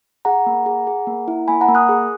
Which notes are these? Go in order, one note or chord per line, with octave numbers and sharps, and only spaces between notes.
G#4 F#5 A#5
A#3
G#4
G#4
A#3
E4
A#3 G#5 B5
F#5 A#5
A#3
D#6 F#6
G#4